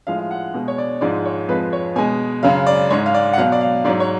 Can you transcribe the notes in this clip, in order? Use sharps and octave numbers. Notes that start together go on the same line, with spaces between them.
A2 F3 G#3 F5
F5
F#5
B2 G#3
C#5
D5
G#2 F3 G#3 D5
C#5
F2 F3 G#3 B4
C#5
B2 G#3 G#5
F#2 C#3 F#3 F5
D5
G#2 G#3 C#5
F5
D5
F#5
B2 F#3 F5
D5
F5
G#2 F#3 D5
C#5